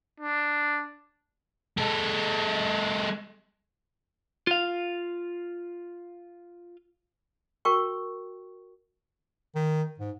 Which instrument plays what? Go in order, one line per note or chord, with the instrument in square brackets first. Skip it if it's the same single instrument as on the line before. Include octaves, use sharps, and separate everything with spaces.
[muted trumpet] D4
[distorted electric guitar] G#3 A4
[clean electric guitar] F4 F5
[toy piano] F#4 A#4 G5 C#6
[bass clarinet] D#3
G#2